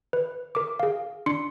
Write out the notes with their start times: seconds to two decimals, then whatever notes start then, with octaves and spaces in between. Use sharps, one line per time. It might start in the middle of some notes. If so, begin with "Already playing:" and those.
0.13 B4
0.55 A#4 D6
0.80 G#4 F5
1.26 D4 C6 C#7